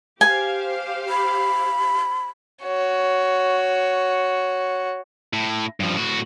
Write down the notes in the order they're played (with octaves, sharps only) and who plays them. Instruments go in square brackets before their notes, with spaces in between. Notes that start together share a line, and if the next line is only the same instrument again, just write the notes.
[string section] G4 C5 F5 [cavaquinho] G#5
[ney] B5
[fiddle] F#4 C#5
[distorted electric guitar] A2
G2 F3
A2 F#4